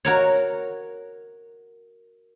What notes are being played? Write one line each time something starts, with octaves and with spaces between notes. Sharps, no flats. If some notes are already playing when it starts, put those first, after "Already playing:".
F#4 A#4 C#5